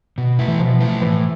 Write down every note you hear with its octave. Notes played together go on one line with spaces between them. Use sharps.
B2
A3 E4 B4
E3
B2 F3
A3 E4 B4
A2 E3